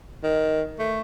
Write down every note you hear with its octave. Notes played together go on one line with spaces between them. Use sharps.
D#3
A3